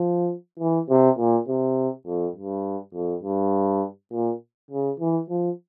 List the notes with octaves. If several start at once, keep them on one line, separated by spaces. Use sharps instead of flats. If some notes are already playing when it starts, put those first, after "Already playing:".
Already playing: F3
E3
C3
A#2
C3
F2
G2
F2
G2
A#2
C#3
E3
F3